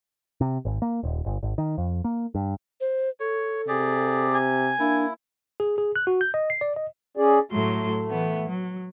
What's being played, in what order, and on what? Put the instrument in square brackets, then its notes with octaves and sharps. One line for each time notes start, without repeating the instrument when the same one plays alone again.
[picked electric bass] C3
G#1
A#3
D#1
G1
G#1
D#3
F2
A#3
G2
[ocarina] C5
[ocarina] A4 [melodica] C#5
[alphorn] C3 [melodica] G4 G#4 D5
[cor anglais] G#5
[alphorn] A#3 [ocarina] D4 [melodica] E4
[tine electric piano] G#4
G#4
F#6
F#4
G6
D#5
C7
D5
D#5
[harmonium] C#4 G#4 D5
[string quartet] A2 F#3 C6 [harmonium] A3
[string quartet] E3 B3
F#3